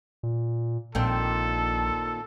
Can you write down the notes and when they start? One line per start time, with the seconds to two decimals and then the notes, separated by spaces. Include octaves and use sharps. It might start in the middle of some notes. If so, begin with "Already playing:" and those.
0.23 A#2
0.95 A#1 A#2 D#3 C4 A4